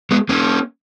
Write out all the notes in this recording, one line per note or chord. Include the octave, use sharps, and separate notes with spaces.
G#3 B3
A#3 C#4